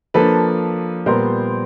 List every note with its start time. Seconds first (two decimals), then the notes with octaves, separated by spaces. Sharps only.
0.14 F3 A#3 D4 A4 B4
1.06 A#2 G3 B3 A#4 C5